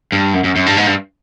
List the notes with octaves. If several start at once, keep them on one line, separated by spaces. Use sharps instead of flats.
G2
F#2
F#2
F#2
G2
G#2
G2